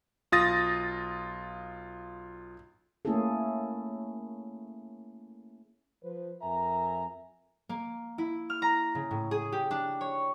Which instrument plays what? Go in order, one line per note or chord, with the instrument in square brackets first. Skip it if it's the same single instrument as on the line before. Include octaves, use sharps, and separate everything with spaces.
[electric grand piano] B1 F4 D#6 A6 A#6
[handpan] A3 A#3 C#4 E4 G#4 A4
[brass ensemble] F3 B4 C5
F2 A#4 E5 G#5 A#5
[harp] A#3
E4
F6
A#5
C#3
A2
G#4
G4
D4
C#5